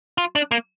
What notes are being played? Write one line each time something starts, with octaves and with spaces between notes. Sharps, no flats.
F4
D4
A#3